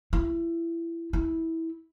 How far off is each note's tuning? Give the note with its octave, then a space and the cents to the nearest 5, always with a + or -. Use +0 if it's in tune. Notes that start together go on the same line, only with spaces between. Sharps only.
E4 +20
E4 -15